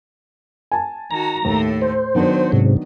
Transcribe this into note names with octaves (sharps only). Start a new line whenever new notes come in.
G#5 A5
D#3 F#4 A#5
D#2 A2 A3
C5
D#3 F#3 B3 D4
G#2 C3